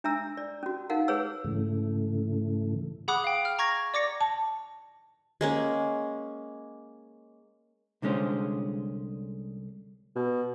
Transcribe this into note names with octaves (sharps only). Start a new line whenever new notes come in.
D4 E5 A#5 E6
D5
C#4 F#4
D#4 A#4 F5 F#5
G#4 B4 C#5 E6
G#2 C#3 E3 A3
G#4 F#5 B5 D6 D#6 F#6
F5 G5
F6
A#5 C#6 G#6 A#6
D5 D6 A#6 C#7
A5
G#3 A#3 C#4
C2 D3 G#3 C#4 G#4 C5
B2